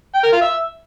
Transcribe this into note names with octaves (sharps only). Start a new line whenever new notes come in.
G5
A#4
F4
E5